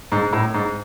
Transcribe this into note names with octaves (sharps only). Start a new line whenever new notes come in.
G#2
A2
G#2